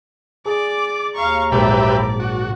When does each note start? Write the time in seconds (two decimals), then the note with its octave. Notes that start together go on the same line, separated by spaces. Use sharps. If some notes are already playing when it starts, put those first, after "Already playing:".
0.45 G#4 D5 D6
1.15 D#2 F5 A#5 C#6
1.52 A#1 G#2 F#3 G4 B4 D5 E5
2.20 F#4